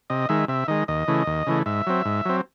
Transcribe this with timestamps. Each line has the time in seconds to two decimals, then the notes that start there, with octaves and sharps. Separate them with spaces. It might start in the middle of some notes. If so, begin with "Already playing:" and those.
0.10 C3 D#5
0.29 D#3 G#3 E5
0.48 C3 E5
0.68 D#3 G#3 D#5
0.88 D#2 D#5
1.08 C#3 E3 A3
1.27 D#2
1.47 C#3 E3 A3
1.66 G#2 E5
1.87 F#3 C4
2.05 G#2
2.25 F#3 C4